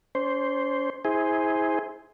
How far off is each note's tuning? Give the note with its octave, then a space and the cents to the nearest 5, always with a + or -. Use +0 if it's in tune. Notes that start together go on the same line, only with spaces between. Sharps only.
C#4 +40 C5 +0
E4 -30 G#4 +0 C5 +0